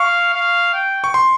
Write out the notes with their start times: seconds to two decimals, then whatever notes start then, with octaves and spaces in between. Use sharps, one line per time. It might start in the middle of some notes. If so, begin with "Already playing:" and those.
Already playing: F5 C#6
0.34 F5
0.74 G5
1.04 C#6
1.14 C6